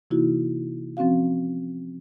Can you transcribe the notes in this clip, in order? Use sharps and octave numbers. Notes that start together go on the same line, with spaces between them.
C3 E3 A#3 D#4 E4 F#4
F3 C4 C#4 F#4 F5